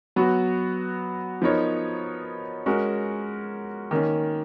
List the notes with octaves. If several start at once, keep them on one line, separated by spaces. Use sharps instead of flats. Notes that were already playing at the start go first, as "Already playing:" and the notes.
F#3 B3 F#4
F3 B3 D#4 A#4 C#5
G#3 C#4 F#4 A#4
D#3 A#3 C#4